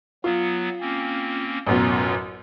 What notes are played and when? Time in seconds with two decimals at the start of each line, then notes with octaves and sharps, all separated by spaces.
0.24 F#3 B3 F4
0.81 A#3 C4 C#4
1.67 A1 F#2 B2 C#4 F4